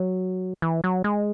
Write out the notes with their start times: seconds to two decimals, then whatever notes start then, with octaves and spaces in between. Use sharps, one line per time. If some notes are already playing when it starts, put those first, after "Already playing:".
Already playing: F#3
0.62 E3
0.84 F#3
1.04 G#3